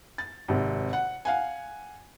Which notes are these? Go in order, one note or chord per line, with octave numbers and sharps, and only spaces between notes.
A6
G#1 C3
F#5
F5 F#5 G#5